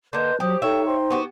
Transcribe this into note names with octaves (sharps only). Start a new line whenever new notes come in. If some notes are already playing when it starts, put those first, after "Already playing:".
D3 A#3 B4 D#5 C6 G6
F#3 G4 C5 D#6
D#4 A4 C#5 E5 G5
C5 G5 C6
B3 F#4 G4